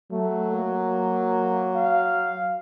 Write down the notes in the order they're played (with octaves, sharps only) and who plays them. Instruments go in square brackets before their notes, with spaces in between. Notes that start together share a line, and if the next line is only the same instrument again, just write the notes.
[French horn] F#3 [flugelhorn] A3
[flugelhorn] A#3
F5